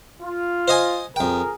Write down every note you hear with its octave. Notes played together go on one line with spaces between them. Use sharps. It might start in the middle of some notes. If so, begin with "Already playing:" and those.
F4
C5 D#5 G#5
F2 G#4 A#4 G5